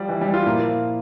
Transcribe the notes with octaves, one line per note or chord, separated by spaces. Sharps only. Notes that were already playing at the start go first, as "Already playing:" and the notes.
Already playing: F3 G3
E3
G3
F4
A#2 F3 A#3 E4 A#4